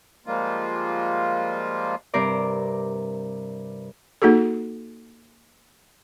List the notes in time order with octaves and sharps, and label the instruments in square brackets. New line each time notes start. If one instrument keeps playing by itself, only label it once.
[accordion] F3 G3 G#3 A#3 F4
[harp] G2 C3 A#4 C5 D5
[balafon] A#3 D#4 F#4 G#4 A4